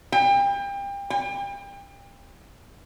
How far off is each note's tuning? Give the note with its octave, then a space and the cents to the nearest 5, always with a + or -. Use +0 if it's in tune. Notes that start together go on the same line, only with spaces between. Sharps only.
G5 +30
G5 +30